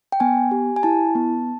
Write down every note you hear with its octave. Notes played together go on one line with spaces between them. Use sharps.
G5
B3 G#5
G4
G#5
E4 A5
B3